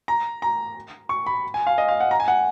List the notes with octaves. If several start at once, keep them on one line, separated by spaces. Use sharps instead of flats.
A#5
A#5
C#6
B5
G#5
F5
D#5
F5
F#5
A#5
G#5
F#5